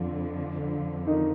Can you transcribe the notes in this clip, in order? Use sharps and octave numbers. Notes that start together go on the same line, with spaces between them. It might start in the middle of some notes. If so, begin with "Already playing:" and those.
Already playing: F2 D3 F3
D#3 D#4